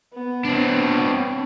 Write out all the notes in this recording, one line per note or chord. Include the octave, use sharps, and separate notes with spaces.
B3
C4 D4